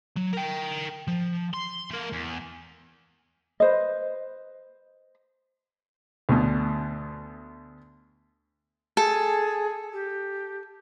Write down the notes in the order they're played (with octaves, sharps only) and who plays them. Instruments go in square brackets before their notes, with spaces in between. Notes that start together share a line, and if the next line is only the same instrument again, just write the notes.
[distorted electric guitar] F#3
A#4 G5
F3
C6
A3 A#4
E2
[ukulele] B4 C5 D#5
[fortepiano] D2 B2
[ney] G#4 [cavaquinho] A4
[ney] G4